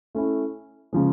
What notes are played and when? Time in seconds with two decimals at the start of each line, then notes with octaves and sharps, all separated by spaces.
0.15 A3 C#4 E4
0.93 C#3 F3 G#3